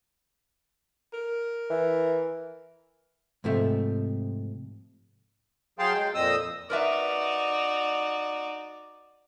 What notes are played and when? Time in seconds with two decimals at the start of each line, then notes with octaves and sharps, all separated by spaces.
1.13 A#4
1.70 E3
3.44 G#2 C3 F3 A3
5.79 F#3 G#4 F5 G5 A5 C6
5.94 G#3 G5
6.14 F2 A#2 C4 D#5 D#6 E6
6.70 D#4 F#4 A#4 B4 D5 E5